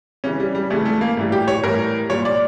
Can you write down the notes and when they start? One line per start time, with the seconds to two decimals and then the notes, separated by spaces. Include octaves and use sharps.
0.24 C#3 E3 G3 C#4
0.40 G3
0.55 G3
0.70 C#3 E3 G3 A3
0.85 A3
1.01 A#3
1.17 A2 E3 G3
1.32 G4
1.48 C#5
1.63 A2 E3 G3 A#4
2.10 A#2 G3 C#5
2.25 D5